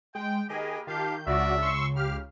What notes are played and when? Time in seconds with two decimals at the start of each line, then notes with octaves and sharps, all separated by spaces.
0.15 G#3 G5
0.49 D#3 A#3 G4 G#4 B4 D#5
0.87 D#3 F4 G4 F5 A5 G6
1.27 C#2 C#3 D4 F4 F#4 D5 E5
1.62 C6 C#6 E6
1.96 G4 F5 F6